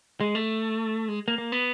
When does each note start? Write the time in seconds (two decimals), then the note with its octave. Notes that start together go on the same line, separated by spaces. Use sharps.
0.20 G#3
0.35 A3
1.08 G#3
1.28 A#3
1.38 A#3
1.52 B3